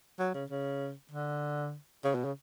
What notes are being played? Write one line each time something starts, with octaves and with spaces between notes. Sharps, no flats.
F#3
C#3
C#3
D3
C#3
B2
C#3